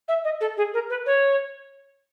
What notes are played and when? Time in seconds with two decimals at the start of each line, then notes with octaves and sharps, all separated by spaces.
0.08 E5
0.24 D#5
0.41 A4
0.57 G#4
0.74 A#4
0.90 B4
1.06 C#5